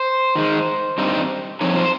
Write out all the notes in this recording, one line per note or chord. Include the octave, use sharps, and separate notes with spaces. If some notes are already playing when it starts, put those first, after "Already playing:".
Already playing: C5
D#3 G#3 D#4
G2 G3 C4 D#4
G2 F3 C4 D#4 C#5
C5